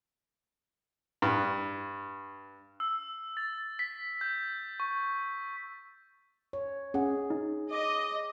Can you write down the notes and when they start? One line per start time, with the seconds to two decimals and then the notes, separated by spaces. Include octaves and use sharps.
1.22 G2
2.80 E6
3.37 A6
3.79 B6
4.21 G6
4.80 C#6
6.53 C#5
6.94 C#4 G#4 F#5
7.30 D#4
7.71 D#5 D6